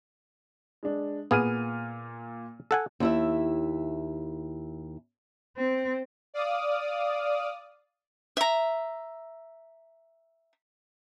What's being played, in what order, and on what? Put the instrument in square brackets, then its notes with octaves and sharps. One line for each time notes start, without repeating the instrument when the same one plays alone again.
[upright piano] G#3 D4
[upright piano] A#2 F6 D#7 [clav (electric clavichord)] B3 G#4
[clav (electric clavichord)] A4 F#5 G#5
[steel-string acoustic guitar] D#2 E4 E5
[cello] C4
[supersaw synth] D5 F5 D#6
[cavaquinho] E5 A#5